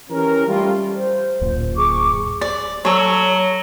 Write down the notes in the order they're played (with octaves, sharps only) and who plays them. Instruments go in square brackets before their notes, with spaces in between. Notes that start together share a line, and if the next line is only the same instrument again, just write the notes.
[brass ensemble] E3 C#4 G4 A#4
G3 A3 F4
[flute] C5
[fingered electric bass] D1 F#2 A#2
[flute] G#4 [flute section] C#6 D6
[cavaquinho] D5
[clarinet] F#3 [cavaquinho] A4 C#5